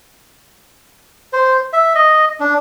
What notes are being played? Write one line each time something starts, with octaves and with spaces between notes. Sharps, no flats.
C5
E5
D#5
D4